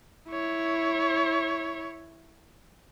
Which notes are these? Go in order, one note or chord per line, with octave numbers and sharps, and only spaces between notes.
E4 C#5